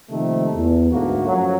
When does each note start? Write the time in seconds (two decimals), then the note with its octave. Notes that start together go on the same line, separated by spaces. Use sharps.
0.11 C3 D#3 F3 A3 A#3
0.55 E2
0.91 D2 G#2 A3 A#3 F#4
1.27 F#2 F3 F#3